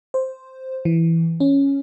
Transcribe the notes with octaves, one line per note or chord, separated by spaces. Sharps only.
C5
E3
C#4